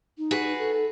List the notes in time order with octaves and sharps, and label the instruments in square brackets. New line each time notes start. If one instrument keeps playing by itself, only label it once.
[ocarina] D#4
[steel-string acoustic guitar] F#4 G#4 B4
[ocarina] A4